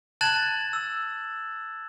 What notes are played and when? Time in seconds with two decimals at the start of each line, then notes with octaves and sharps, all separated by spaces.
0.21 A5 F#6 G#6 A6 E7 F#7
0.73 E6